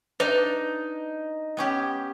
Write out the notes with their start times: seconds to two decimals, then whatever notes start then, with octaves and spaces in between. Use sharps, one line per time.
0.20 D4 D#4 B4 A5
1.57 B3 C#4 G4